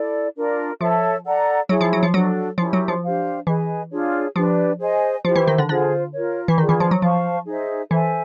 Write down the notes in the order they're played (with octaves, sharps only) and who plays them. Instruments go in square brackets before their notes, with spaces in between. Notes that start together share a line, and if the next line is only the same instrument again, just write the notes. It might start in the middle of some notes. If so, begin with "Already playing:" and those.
Already playing: [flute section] E4 A4 D5
D4 F4 A#4
[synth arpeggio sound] F3 [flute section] A4 C#5 E5 A5
[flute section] A4 D5 F#5 A#5
[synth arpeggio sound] F#3 [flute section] E4 G#4 C#5
[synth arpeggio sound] F3
F#3
F3
[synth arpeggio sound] F#3 [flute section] D4 F#4 A4
[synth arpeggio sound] F3 [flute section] C#4 E4 G4 A#4
[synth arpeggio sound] F#3
F3
[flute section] D4 G4 C5 F5
[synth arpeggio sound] E3 [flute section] G#4 B4 D#5 G#5
[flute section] D4 F4 G#4 C#5
[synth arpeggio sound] F3 [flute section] D4 G4 B4 D5
[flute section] G#4 C5 D#5 G#5
[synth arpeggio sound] F3 [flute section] E4 G4 C5
[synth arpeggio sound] E3
D#3
D3
[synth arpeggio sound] D3 [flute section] F4 G#4 C5
[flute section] F4 A#4 C#5
[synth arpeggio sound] E3
[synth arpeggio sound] D#3 [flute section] D4 F4 G#4
[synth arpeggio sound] E3
F3
F#3
[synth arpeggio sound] F3 [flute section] C5 F5 A5 C#6
[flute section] D#4 G#4 C5 E5
[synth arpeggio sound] E3 [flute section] A4 C5 E5 G#5